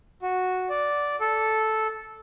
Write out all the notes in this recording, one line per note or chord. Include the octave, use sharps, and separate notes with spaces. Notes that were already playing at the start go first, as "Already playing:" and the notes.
F#4
D5
A4